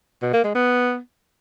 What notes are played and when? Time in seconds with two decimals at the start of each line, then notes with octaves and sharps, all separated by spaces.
0.22 B2
0.33 A#3
0.44 G#3
0.55 B3